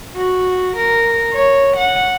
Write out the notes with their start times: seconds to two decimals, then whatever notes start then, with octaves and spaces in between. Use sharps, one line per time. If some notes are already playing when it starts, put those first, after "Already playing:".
0.16 F#4
0.77 A#4
1.33 C#5
1.77 F#5